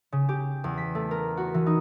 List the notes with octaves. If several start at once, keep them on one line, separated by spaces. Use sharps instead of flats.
C#3
G4
E2
B6
A3
A#4
F#4
E3
D#4